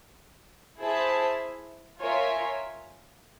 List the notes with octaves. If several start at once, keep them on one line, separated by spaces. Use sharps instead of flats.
E4 G#4 C5 E5 A5
F4 A#4 C#5 E5 G#5